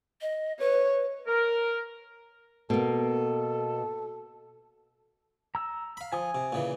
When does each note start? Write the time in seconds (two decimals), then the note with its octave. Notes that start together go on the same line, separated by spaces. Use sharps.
0.21 D#5
0.60 B4 C#5
1.27 A#4
2.70 B2 A#3 A4
5.55 A#5 E6
5.97 F5 B5
6.13 F3 G#5 D#6
6.35 C3
6.52 A#2 C#3 E3